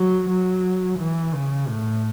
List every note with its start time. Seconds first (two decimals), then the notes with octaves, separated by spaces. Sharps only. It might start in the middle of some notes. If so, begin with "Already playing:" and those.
Already playing: F#3
0.29 F#3
0.99 E3
1.34 C#3
1.68 A2